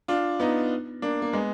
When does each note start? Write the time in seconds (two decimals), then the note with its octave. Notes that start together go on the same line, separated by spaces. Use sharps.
0.08 D4 F4
0.40 B3 D#4
1.02 A#3 D4
1.22 A#3
1.33 G#3 B3